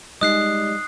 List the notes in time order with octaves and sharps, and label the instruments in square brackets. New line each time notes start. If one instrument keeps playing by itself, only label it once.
[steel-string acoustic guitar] G3 G#3 [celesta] D#4 D#5 [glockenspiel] D#6 F#6 C7